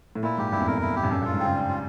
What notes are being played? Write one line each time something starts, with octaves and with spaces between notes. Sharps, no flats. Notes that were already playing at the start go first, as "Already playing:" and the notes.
A2
A#2 E4
G#2 G4
G2 E4
E2
F2 A#4
E4
G4
G2
F#2 A4
G2
F4
G#2
C#3 C4
G3
F4